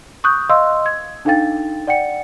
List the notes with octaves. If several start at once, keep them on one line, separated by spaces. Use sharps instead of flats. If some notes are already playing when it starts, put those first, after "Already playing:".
C#6 D#6 F#6 G6
D#5 F5 C6 E6
G#6
D4 D#4 A4 F5 G5 A6
D5 F#5 G5 C#7